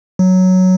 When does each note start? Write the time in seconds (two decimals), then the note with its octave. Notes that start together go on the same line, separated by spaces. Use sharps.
0.19 F#3